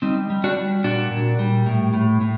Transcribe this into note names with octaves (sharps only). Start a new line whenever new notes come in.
G3 C4 D#4
G3
D4 F#4
G3
A#2 D4 F#4
A#2
G3
A2
A2
A2